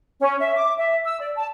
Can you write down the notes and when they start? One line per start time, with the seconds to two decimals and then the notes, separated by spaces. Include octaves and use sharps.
0.20 C#4
0.39 E5
0.55 D6
0.77 E5
1.05 E6
1.20 D5
1.35 A5